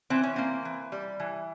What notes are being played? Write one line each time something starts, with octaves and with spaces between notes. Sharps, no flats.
E3 C4
C#4
A#3 C4
E3
G3
E3